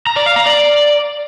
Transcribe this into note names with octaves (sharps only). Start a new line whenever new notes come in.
A#5
D5
F5
A#5
D5